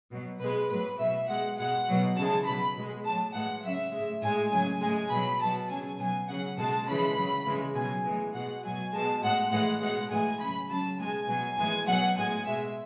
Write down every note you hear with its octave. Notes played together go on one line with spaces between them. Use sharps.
B2 F#3
B2 G#3 B4
A2 F#3 B4
B2 F#3 E5
B2 G#3 F#5
B2 G#3 F#5
B2 F#3
C#3 E3 G#3 A5
B2 F#3 B5
B2 G#3
A2 F#3 A5
A2 E3 G#3 F#5
C#3 F#3 E5
A2 G#3
A2 G#3 G#5
C#3 F#3 G#5
A2 G#3 G#5
B2 F#3 B5
B2 F#3 A5
C#3 F#3 G#5
B2 F#3 G#5
C#3 F#3 F#5
B2 G#3 A5
C#3 E3 G#3 B5
C#3 F#3
C#3 E3 G#3
B2 F#3 G#5
A2 E3 G#3
B2 G#3 F#5
B2 F#3 G#5
B2 G#3 A5
A2 G#3 F#5
A2 E3 G#3 F#5
B2 G#3 F#5
A2 E3 G#3 G#5
C#3 F#3 B5
C#3 F#3 A5
B2 G#3 G#5
B2 F#3 G#5
A2 E3 G#3 G#5
B2 F#3 F#5
A2 G#3 G#5
B2 G#3 E5